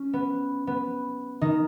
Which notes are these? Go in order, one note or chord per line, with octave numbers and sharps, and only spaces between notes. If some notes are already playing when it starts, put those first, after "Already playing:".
Already playing: C#4
B3
B3
D#3 D#4